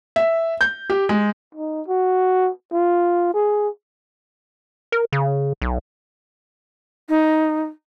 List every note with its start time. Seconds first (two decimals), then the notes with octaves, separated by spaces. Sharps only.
0.16 E5
0.61 G6
0.90 G4
1.09 G#3
1.55 D#4
1.88 F#4
2.72 F4
3.34 G#4
4.92 A#4
5.13 C#3
5.62 B1
7.09 D#4